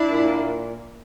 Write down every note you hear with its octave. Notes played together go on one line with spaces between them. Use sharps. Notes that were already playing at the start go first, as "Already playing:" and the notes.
Already playing: D4 E4
A#2
A#3
A#2